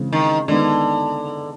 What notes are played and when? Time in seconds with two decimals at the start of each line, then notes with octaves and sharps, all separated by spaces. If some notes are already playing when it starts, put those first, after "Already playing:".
Already playing: C#3 E3 G#3 C4
0.12 D#3
0.48 D3 D#3 G#3 B3 D#4